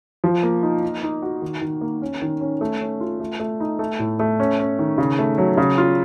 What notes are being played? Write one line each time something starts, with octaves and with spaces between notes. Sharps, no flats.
F3
A#3
D#4
D#4
D#4
F#4
D#3
D#3
A#3
C#4
D#3
C#4
A3
C#4
F4
A3
A3
D#4
A3
A2
A3
C#4
C#4
D#3
C#3
A3
F#3
C#3
F4